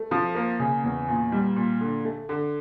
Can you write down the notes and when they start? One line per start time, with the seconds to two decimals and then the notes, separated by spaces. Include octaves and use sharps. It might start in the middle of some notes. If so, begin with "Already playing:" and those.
Already playing: A3
0.11 F3
0.35 A#3
0.59 C#3
0.84 E2
1.08 A#2
1.32 G3
1.56 A#2
1.81 D3
2.05 A3
2.29 D3